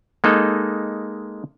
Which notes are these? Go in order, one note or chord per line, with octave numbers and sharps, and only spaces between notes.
G#3 A#3 D#4 A4